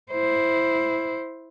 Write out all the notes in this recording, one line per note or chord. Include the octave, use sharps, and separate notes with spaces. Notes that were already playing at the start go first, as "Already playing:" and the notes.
E4 C5